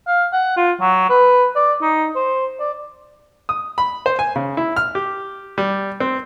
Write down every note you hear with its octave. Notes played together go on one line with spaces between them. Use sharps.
F5
F#5
F4
F#3
B4
D5
D#4
C5
D5
D#6
B5
C5
G#5
C#3
E4
F6
G4
G3
C4